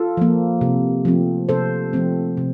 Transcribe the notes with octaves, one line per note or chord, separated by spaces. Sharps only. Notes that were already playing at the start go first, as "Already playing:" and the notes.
Already playing: F4 A4
F3 A#3
C3
F3 A3 C4
C3 A4 C5
F3 A3 C4
C3